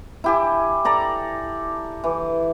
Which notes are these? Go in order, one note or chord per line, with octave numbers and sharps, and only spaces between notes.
E4 G4 G#5
A4 D5 A#5
E3